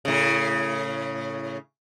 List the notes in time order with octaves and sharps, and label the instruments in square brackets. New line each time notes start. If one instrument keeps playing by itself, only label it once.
[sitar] A2 C#3